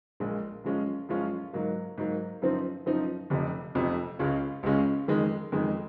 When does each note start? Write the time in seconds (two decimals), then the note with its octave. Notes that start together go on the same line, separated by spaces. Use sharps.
0.20 A#1 A#2 G#3
0.64 F#2 F3 G#3 C#4 F4
1.09 F#2 F3 G#3 C#4 F4
1.53 G#2 F#3 A#3
1.98 G#2 F#3 A#3
2.42 F#2 F3 C4 D#4
2.86 F#2 F3 C4 D#4
3.30 F1 F2 C3 F3
3.75 F1 F2 C3 F3
4.19 C#2 C#3 G#3 C#4 F4
4.63 C#2 C#3 G#3 C#4 F4
5.08 F2 D#3 G#3
5.52 F2 D#3 G#3